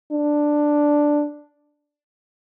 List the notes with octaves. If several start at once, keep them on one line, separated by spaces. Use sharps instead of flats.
D4